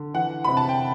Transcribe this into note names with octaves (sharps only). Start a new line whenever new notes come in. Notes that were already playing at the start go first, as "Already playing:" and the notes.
Already playing: D3
E3 F#5
C3 B5
A5
G5